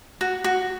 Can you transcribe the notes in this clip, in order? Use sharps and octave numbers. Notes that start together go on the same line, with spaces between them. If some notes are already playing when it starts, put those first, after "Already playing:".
F#4
F#4